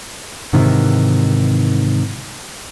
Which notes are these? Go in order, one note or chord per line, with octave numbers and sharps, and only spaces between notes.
G#2 C3 D#3 E3